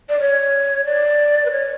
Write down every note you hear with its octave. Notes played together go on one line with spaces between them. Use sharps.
D5
C#5
D5
B4
C#5